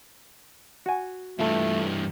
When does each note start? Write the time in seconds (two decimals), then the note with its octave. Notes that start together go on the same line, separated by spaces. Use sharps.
0.86 F#4 G#5
1.39 G2 E3 A3 F4 A4